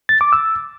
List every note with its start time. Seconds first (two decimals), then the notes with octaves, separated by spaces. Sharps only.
0.09 A6
0.21 D6
0.33 E6